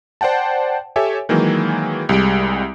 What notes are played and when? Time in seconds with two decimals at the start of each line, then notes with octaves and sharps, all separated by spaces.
0.21 C5 D5 F#5 G5 A5
0.96 G4 A4 C#5 E5 G#5
1.29 D#3 E3 F#3 G#3 A#3
2.09 C2 G3 G#3 D7